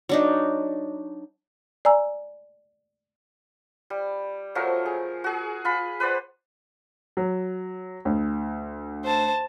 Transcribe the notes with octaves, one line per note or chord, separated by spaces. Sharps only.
F#3 D4 D#4
D5 G#5 A#5 E6
G3
F3 F#3 A3 A#4
G#4
F#4 G#4
F4 B5
B4 C5 D5 F#5
F#3
D2
C5 A5